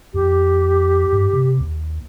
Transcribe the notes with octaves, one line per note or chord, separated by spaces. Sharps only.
F2 G4
G2
C3
D#2